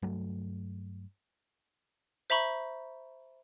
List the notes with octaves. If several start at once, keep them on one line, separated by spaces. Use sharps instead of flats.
G2 F#3 A3
C5 E5 A#5 B5 C#6